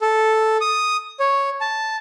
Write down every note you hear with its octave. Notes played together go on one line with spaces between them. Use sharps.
A4
D#6
C#5
A5